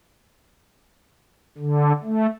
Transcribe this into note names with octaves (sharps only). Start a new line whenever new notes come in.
D3
A3